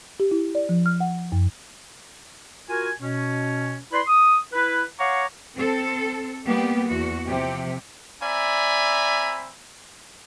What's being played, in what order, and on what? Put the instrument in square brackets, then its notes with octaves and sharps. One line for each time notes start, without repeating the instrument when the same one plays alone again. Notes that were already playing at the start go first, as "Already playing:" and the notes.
[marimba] G4
E4
D5
F3
F6
F#5
F#2
[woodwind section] F4 F#4 A#4 G#5
B2 C#4
E4 B4 D5 B5 C6
D#6
E4 B4
C#5 F5 F#5 A#5 C#6 D6
[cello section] C4 A4
G3 A#3 B3 G4
E2 F#4
C3 F3 G4
[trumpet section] C4 D5 E5 G#5 A#5 B5